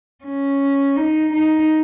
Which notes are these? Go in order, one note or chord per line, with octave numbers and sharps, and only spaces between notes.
C#4
D#4
D#4